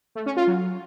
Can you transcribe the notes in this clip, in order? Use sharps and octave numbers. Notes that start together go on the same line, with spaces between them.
A3
C#4
F4
F#3